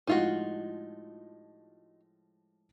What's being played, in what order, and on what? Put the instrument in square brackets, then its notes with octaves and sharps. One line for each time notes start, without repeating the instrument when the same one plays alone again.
[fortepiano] A2 F3 G#3 [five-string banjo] D#4 F4 F#4